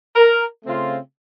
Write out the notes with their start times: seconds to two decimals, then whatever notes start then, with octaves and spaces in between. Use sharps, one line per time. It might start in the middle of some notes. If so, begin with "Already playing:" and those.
0.15 A#4
0.64 C#3 A3 C4 F4